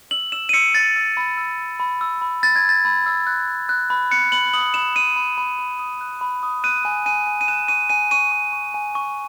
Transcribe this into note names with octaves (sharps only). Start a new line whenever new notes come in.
E6 F#7
E6 E7
D#7
E6 C#7
E6 A6
E6
B5
E6
E6
B5
E6
B5
B5 A6
G#6
E6 A6
B5
E6
F#6
F#6
F#6
B5
F#6 C#7
B5 F#7
D#6 F#7
B5 E7
F#6 D#7
B5
B5
B5
D#6
F#6
B5
D#6
F#6 D#7
G#5
G#5 D#7
G#5
D#7
F#6 E7
C#6 D#7
G#5 D#7
C#6 D#7
C#6
C#6
G#5
C#6